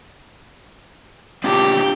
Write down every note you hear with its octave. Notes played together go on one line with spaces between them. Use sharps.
C4 D4 F4 G4